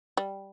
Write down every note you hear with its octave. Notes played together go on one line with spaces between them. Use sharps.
G3